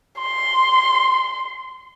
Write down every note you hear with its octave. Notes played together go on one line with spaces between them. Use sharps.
C6